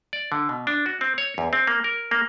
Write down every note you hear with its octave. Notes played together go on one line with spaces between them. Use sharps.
D5
D3
B2
D4
F#4
C4
C#5
E2
C4
A#3
A#4
A#3